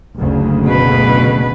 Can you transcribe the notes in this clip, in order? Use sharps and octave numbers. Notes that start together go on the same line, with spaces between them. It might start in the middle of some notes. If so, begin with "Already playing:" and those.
F#1 D2 C#3
B2 B4